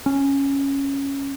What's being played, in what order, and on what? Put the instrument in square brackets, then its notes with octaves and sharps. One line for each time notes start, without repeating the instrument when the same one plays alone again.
[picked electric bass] C#4